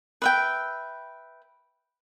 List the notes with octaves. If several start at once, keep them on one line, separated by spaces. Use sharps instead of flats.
B4 E5 G5